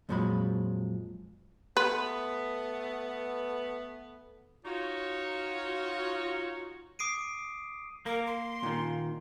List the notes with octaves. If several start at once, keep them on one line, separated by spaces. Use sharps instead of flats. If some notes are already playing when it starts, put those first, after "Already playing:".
F2 A#2 F3 F#3 G#3 B5
A3 B3 B4
D#4 F4 F#4 C#5
D6 D#6 C7 D7 D#7
A#3 A#4
C6
A#2 D#3